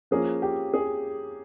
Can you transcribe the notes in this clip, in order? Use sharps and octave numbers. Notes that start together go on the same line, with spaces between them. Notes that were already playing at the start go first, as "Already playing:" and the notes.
F3 A#3 C#4 G#4
G4
G#4